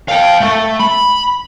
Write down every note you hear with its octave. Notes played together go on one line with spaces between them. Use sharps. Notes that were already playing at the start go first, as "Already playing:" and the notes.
F5 G5
A3
B5